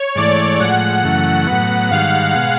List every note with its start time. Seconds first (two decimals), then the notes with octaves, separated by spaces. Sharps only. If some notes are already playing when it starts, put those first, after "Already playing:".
Already playing: C#5
0.15 G#2 E3 A3 D5
0.60 A2 F3 G#3 F#5
1.03 F#2 C#3 E3 A3
1.47 A2 F#3 B3
1.91 G#2 D#3 G3 F5
2.35 B2 G#3